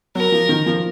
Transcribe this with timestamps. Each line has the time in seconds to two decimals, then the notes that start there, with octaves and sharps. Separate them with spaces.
0.15 F#3 A#4
0.32 F3
0.49 D#3
0.66 F3